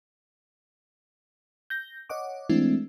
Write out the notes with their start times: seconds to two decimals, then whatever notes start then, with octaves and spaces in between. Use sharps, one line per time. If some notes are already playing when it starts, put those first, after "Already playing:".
1.70 G6 A#6
2.10 C#5 D#5 F#5 D6
2.49 E3 G#3 A3 C4 D4 E4